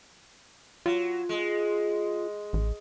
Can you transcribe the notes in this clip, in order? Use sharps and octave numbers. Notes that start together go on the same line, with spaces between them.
F#3 F4
G#3
A1